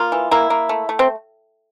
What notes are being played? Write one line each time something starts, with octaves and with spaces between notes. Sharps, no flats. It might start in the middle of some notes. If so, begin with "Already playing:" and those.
Already playing: A#3 F4
E3
A#3 E4
A#3
A3
A3
C4